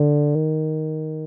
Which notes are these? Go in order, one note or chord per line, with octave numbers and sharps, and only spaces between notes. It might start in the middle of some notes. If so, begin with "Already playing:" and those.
Already playing: D3
D#3